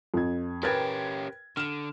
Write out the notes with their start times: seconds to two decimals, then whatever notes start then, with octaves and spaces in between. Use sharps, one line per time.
0.14 F2 G#6
0.63 C#4 G4 A#4 B4 G5 G#6 A6
1.57 D3 F6 E7